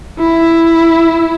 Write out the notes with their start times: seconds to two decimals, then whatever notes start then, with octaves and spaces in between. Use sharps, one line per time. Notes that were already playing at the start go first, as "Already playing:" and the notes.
0.20 E4